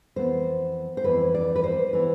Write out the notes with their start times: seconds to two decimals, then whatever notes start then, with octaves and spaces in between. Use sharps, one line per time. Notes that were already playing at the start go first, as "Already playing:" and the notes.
0.16 F2 E3 B3 C5
0.97 C5
1.04 F2 E3 B3 B4
1.35 D5
1.56 B4
1.64 C5
1.93 E3 B3 B4